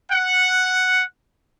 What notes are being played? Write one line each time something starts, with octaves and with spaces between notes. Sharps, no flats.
F#5